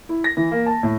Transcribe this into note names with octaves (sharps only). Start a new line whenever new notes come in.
E4
A#6
E3
A#3
A5
A2